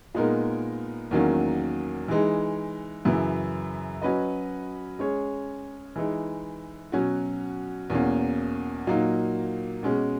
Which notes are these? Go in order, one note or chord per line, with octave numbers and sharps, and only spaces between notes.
A#2 G#3 B3 D#4 A#4
E2 D#3 F#3 A#3 C#4
E3 G#3 D#4
F#2 C#3 E3
F#3 C#4 F#4 B4 D#5
G#3 C#4 G#4 C#5
E3 G#3 D#4
B2 F#3 C#4 F#4
E2 B2 A#3 C#4
A#2 F#3 A#3 D#4
B2 G#3 C#4